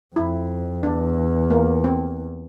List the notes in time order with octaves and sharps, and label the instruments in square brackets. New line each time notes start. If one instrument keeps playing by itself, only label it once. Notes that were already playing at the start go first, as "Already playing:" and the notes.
[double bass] F2 [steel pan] E4
[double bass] E2 [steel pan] D4
[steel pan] A#3
C4